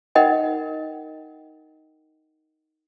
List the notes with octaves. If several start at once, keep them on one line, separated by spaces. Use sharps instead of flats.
D#4 A#4 D#5 F#5 G5